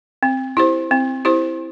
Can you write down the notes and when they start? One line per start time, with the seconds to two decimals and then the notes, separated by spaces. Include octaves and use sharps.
0.23 C4
0.57 E4 G4 C5
0.91 C4
1.25 E4 G4 C5